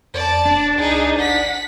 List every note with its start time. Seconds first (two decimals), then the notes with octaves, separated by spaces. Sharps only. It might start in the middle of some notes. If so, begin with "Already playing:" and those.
0.14 F2 D5 A5
0.45 E1 D4
0.78 C#2 D#4 G#4
1.18 G1 F#5 B6